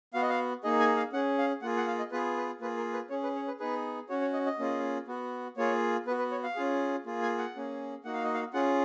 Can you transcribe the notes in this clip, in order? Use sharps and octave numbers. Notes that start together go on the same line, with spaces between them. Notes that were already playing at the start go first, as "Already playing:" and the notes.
B3 F#4 F5
D#5
F5
A#3 D#4 G#4 D#5
G#5
F5
C#4 G#4 F#5
F5
A#3 F4 G#4 F#5
F#5
F5
D#5
B3 F4 G#4 B4
B4
A#3 F4 G#4 B4
A#4
B4
C#4 G#4 C#5
B4
C#5
B4
B3 D#4 G#4 B4
C#4 F#4 C#5
C#5
D#5
D#5
A#3 C#4 F4 G#4
B3 F#4
A#3 F4 G#4 C#5
B3 F#4 B4
B4
C#5
F5
C#4 F4 G#4
A#3 F4 G#4
G#5
F#5
A#3 C#4 G#4
A#3 D#4 F#4 F#5
F5
D#5
F5
C#4 F4 G#4 F#5